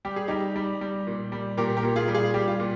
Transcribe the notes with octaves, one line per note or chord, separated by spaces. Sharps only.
G3 G4
G#4
G3 D#4 G4
G3
G3
A#2
G3
A#2 G4 A#4
G4 A#4
A#2
F4 G#4
G3
F4 G#4
G3 G4
F4
A#2